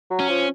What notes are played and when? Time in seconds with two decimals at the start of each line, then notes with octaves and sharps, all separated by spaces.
0.10 F#3
0.20 C#4
0.30 F3